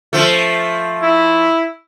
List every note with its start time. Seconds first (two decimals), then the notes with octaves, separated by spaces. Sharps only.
0.13 F3 A3
1.02 E4